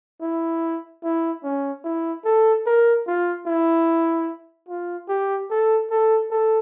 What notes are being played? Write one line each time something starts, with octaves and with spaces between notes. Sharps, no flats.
E4
E4
C#4
E4
A4
A#4
F4
E4
F4
G4
A4
A4
A4